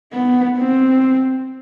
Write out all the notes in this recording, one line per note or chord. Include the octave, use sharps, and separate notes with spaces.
B3
C4